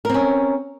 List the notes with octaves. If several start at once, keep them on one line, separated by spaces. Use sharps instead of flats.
C4 C#4 A#4